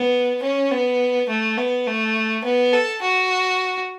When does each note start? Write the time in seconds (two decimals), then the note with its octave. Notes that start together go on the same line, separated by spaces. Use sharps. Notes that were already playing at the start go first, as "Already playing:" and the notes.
Already playing: B3
0.43 C#4
0.71 B3
1.29 A3
1.58 B3
1.87 A3
2.44 B3
2.73 A4
3.01 F#4